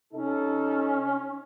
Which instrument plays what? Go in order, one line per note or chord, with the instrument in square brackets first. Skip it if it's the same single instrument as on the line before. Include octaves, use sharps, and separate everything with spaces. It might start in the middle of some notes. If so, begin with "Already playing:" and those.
[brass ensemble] C3 D#4 A4 [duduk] C#4